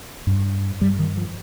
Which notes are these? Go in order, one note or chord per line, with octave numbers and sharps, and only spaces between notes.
G2
G2 G3
D#3
F3